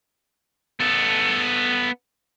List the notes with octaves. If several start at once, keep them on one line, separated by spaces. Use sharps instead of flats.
B3 A4